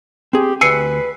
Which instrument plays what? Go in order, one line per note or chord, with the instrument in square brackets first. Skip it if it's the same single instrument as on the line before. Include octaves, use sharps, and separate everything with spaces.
[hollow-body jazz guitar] C4 G#4 [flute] G4
[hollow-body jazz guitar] D2 G#5 [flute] B4 [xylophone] E6 C7 C#7